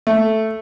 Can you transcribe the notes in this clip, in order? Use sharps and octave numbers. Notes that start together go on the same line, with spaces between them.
A3